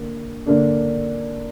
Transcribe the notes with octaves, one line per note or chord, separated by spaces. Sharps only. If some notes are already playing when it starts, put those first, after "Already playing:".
Already playing: D3 A#3
D3 A#3 D4